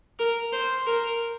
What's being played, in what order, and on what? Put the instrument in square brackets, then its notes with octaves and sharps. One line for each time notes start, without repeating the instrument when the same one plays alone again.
[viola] A#4
C5
A#4